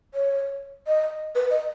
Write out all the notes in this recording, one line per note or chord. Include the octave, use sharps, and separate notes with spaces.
C#5
D#5
B4
D#5